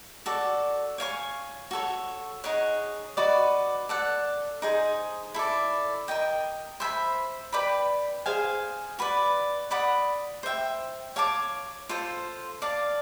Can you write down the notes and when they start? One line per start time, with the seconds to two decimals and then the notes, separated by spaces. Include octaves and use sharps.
0.26 F#4 A4 D5
0.98 C#5 F5 G#5 C#6
1.71 F#4 A4 C#5
2.44 D#4 G#4 C#5 F#5
3.17 D#4 F#4 B4 D5
3.89 A4 D5 F#5
4.62 D#4 G#4 C5
5.34 E4 A4 D5
6.08 A#4 D#5 G5
6.80 C5 E5 G#5 B5
7.52 B4 D5 G5 B5
8.26 G#4 C5 F5 G#5
8.99 F#4 B4 D5
9.71 D5 F#5 B5 D#6
10.43 C5 E5 G5
11.16 C#5 F5 A5 D6
11.89 F4 A4 C5
12.62 D5 F5 A5